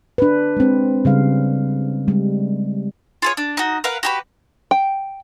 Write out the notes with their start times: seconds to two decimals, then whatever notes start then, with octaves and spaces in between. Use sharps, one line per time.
0.18 D4 B4
0.57 G#3 C4
1.05 C#3 G3 F5
2.08 G3 G#3
3.22 F4 G#4 C#5
3.37 D4
3.57 D#4 F#4
3.84 A#4 B4 F5 F#5
4.03 F#4 G4 B4
4.71 G5